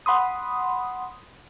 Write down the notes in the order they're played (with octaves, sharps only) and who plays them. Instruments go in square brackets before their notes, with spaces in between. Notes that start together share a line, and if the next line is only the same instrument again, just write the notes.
[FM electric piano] F#5 B5 C6 D#6